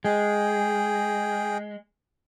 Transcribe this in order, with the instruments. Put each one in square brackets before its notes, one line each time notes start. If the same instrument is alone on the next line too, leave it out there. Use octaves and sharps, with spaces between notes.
[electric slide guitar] G#3 [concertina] G#4 G5